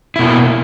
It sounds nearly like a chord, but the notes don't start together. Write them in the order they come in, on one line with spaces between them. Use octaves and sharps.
E4 B2 A#3